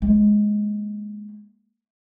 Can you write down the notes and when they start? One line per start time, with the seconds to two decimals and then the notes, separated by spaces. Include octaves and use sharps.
0.02 G#3 A#3